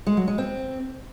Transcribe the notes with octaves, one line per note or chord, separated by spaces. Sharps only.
G#3
F#3
G#3
C4